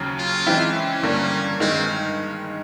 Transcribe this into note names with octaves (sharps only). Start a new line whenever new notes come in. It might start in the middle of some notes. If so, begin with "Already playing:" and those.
Already playing: D#2 C#3 F#3
F4
E3 G#3 C4 E4
C#4
G2 D3 G3 A#3
G2 D#3 G#3 C4